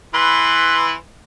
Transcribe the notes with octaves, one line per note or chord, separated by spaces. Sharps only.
E3 B4 C6